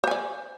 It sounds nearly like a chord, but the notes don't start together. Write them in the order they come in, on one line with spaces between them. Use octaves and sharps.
C5 G#5 D5